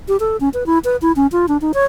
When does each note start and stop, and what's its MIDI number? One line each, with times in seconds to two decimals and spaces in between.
0.08 0.17 67
0.20 0.37 69
0.40 0.49 61
0.54 0.66 71
0.66 0.79 64
0.84 0.96 71
1.02 1.12 64
1.16 1.27 61
1.32 1.46 65
1.48 1.57 62
1.61 1.72 63
1.74 1.85 73